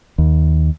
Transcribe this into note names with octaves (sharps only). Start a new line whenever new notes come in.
D#2